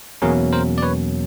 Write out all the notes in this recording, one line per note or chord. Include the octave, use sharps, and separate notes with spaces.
E2 B2 F#3 A#3 C#4 G#4 A#4
A#4 C5
D5
B4 C#5